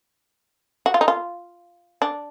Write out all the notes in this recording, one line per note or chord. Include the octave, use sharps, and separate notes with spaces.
F#4
F4
D#4
F4
D4